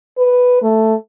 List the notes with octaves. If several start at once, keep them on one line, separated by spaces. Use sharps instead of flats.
B4
A3